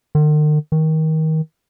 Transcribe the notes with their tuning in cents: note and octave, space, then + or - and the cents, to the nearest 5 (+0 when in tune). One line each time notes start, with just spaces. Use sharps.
D#3 -45
D#3 +25